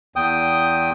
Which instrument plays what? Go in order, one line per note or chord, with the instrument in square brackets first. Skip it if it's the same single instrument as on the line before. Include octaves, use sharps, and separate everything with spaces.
[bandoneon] E2 G5 D#6